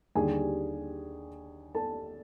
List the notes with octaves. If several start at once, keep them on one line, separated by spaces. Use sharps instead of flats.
D#2 D3 G3 G#4 G#5
A4 A5